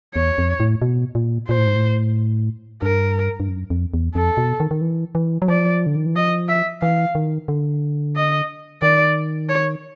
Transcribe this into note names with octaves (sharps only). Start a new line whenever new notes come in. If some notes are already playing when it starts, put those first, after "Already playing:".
E2 C#5
F2
A2
B2
A#2
A#2 C5
A2
G#2
A2
G2 A#4
G2
F#2
F2
E2
F2 A4
B2
D#3
D#3
E3
E3
F#3
F3 D5
D3
D#3
E3
F3 D#5
E5
E3 F5
D#3
D3
D#5
D#3 D5
C#5